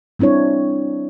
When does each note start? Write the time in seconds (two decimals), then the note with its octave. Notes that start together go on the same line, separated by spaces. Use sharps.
0.19 G3 C4 D4 E4 C#5